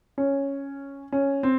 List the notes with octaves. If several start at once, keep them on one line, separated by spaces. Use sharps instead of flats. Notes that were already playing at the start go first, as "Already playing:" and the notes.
C#4
C#4
C4